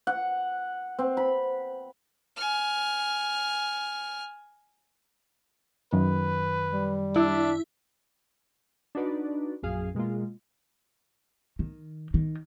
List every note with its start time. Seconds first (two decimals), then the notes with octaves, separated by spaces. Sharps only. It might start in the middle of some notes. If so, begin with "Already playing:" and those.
0.07 F#5
0.99 C4
1.17 B5
2.37 G#5 F6
5.93 F#2 D#3 B4
6.71 G3
7.16 D4 E4
8.95 D4 D#4 F#4 B4 D5
9.63 A#1 F#2 G#4 F5
9.95 B2 G#3 A#3 F4
11.59 D#3
12.14 D#3